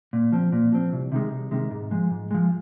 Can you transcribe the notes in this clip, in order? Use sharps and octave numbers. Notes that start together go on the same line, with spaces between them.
A#2
F3 C4
A#2
F3 C4
C2
C3 D#3 G#3
C2
C3 D#3 G#3
G#2
F3 G#3
G#2
F3 G#3